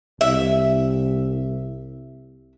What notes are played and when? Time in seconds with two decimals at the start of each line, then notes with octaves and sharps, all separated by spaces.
0.21 C2 E5